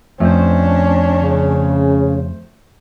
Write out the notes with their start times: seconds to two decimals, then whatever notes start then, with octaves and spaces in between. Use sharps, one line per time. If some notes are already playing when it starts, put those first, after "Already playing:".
0.20 F2 A3 C#4 D4 C5
1.23 C#3